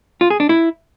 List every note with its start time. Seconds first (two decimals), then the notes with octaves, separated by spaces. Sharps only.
0.21 F4
0.30 G#4
0.40 D4
0.49 E4